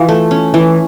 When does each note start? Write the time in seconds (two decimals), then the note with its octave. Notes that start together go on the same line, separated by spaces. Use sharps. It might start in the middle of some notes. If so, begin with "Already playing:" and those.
Already playing: E3 F4
0.09 A3
0.31 C#4
0.54 E3